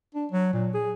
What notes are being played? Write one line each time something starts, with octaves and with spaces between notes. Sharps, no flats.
D4
F#3
A#2
G#4